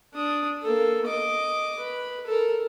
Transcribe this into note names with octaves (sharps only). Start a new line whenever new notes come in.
D4 D#6
A#3 A4
D#5 D6
B4
A4 A#4